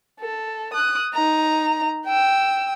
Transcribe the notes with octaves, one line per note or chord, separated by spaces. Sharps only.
A4
D#6 F#6
D#4 A#5
G5 E6